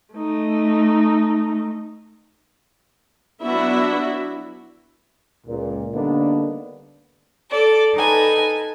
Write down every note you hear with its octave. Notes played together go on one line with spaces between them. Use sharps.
A3 D#4
F#3 B3 D4 E4 F#4 E5
C#2 A#2
D3 G3 A#3 B3 D4 D#4
A4 D5
D#4 A4 B4 G#5